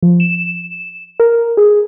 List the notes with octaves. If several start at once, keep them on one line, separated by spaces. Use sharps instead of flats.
F3
E7
A#4
G#4